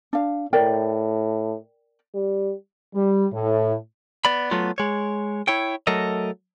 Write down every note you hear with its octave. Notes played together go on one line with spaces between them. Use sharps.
D4 F5
A2 A#4 D5 G5
G3
G3
A2
B3 D5 B5
F#3 A3 B3 F4
G#3 C#5
E4 C#5 G5
F#3 A3 A4 A#4 D#5